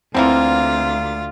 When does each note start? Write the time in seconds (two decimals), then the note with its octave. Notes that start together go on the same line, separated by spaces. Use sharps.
0.14 D2 D3 E3 A#3 C4 F4 A6